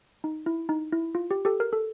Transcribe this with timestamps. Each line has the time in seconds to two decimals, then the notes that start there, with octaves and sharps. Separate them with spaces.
0.24 D#4
0.46 E4
0.69 D#4
0.92 E4
1.15 F4
1.31 G4
1.45 G4 A4
1.60 A#4
1.73 A4